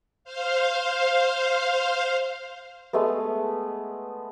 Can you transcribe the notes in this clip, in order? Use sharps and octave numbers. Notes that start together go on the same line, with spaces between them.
C5 F5
G#3 A3 B3